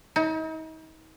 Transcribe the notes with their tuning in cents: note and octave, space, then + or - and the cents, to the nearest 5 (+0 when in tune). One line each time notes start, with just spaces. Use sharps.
D#4 +40